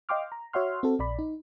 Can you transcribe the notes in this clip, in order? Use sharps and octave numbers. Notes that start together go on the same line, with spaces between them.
D#5 F5 G5 C6 D6 F6
A#5
F#4 C#5 E5 F#5 C6 F6
C4 F#4 A4
A#1 D5 B5
D#4